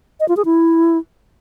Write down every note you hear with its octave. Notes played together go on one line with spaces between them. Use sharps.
D#5
F4
G#4
E4